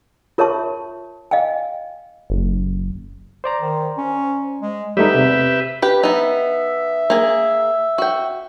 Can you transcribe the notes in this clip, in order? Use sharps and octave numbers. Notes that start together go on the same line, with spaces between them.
F4 A#4 C#5 E5 A5 C#6
D#5 F5 G5 G#5
F#1
C5 D5 A#5
D#3
C#4
G#3
E2 G3 A3 D#4 G4 B4 E5
C3
G4 B4
B3 D#4 E5
A#3 G#4
F#4 G5